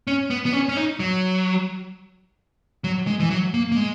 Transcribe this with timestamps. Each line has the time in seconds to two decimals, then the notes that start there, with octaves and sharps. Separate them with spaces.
0.07 C#4
0.30 B3
0.46 B3
0.53 C#4
0.69 C#4
0.77 D#4
0.99 F#3
2.84 F#3
3.07 G#3
3.20 E3
3.30 F#3
3.54 A#3
3.72 A#3
3.76 G#3